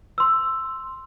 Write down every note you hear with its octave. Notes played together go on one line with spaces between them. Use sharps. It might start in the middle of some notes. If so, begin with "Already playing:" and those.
C6 E6